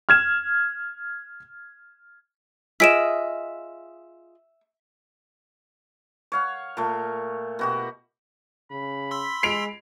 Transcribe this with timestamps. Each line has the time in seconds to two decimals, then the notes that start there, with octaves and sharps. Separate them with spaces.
0.09 F6 G#6 E7
2.80 F4 G#4 D#5 E5 B6 D7 E7
6.32 C#5 F5 F#5
6.77 A#2 A3
7.59 B2 F#4 G4
8.71 C#3 B5
9.11 C6 E6 B6
9.43 G#3 C7 D7 F7